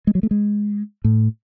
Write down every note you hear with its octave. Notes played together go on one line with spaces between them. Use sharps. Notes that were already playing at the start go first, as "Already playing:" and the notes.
G#3
F#3
A3
G#3
A2